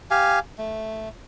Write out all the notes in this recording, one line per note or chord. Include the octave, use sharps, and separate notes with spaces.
G4 F5 G#5
A3